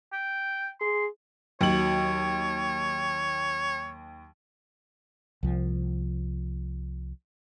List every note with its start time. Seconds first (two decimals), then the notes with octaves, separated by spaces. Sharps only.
0.13 G5
0.81 G#4 C6
1.61 D#2 F#3 C#5 F#7
5.43 C2 F3